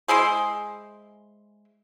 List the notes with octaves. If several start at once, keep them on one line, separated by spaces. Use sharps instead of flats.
G#3 E4 G#4 C5